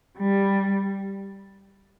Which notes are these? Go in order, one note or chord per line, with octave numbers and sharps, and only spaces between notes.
G3